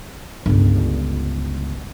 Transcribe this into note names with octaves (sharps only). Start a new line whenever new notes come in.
G1 C#2